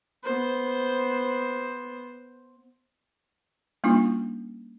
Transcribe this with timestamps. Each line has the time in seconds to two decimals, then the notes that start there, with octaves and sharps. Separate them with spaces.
0.24 B3 C5
3.84 G3 A#3 C#4 D4 E4 F4